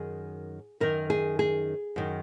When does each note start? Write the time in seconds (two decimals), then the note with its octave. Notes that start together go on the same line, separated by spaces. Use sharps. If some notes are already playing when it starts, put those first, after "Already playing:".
Already playing: F#2 D#3 G#4
0.80 F#2 D#3 A#4
1.10 G#4
1.39 G#4
1.96 F#2 D#3